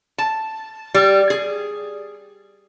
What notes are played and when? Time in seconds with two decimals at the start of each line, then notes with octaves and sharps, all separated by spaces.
0.18 A5
0.94 G3
1.30 G#4